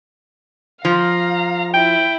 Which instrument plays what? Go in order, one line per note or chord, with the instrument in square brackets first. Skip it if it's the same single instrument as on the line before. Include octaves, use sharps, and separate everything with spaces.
[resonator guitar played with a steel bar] F3 [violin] F5 A#5
[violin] E4 [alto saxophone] G5